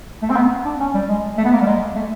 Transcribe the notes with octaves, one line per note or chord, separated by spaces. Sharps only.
A3
C4
B3
D4
C#4
G3
G#3
A3
B3
A#3
G3
G#3
A3